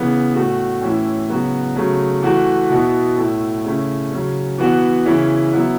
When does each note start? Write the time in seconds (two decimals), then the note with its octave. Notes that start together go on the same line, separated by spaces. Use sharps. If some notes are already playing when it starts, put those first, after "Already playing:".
Already playing: C#3 E3 B3
0.34 A2 A3 F#4
0.81 A2 E3 C#4 E4
1.29 C#3 F#3 B3 F#4
1.76 C#3 F#3 A3
2.22 E3 A3 F#4
2.70 B2 B3 E4
3.17 A2 A3 E4
3.65 C#3 A3 C#4 E4
4.11 C#3 F#3 C#4
4.58 E3 B3 F#4
5.05 C#3 E3 C#4 E4
5.53 F#3 B3 E4